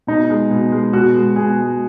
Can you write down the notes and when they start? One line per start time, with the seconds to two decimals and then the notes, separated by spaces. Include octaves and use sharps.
0.07 B2 D#4
0.30 G#3
0.50 B2
0.72 G#3
0.93 B2 F#4
1.16 G#3
1.36 B2 G#4
1.59 G#3